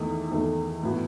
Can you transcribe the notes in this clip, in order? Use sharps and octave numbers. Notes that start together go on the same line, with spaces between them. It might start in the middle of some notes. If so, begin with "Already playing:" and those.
Already playing: E2 D#3 A3 D#4 A4
E2 D#3 A3 D#4 A4
A2 E3 B3 F#4